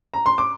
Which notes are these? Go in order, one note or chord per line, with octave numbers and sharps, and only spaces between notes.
A#5
C6
D6